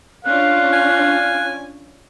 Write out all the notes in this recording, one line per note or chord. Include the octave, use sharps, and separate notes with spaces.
C#4 D4 F4 F5 F#6
G#5